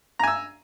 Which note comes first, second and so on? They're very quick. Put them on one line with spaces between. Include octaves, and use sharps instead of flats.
A#5 G#5 E6